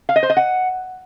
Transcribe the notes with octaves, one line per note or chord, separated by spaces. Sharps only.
F5
D#5
C5
D#5
F#5